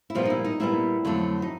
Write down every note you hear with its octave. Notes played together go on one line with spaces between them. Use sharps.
E4
A#2 F3 G3 B3 F4
D#4
E4
D#4
A#2 G3 B3 E4
F2 D3 F#3 A3
D#4